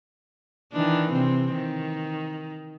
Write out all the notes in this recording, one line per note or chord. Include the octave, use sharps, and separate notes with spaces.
D#3 E3 D4
C3 C4
D#3